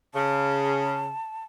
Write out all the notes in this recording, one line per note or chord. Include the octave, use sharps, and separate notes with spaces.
C#3 A5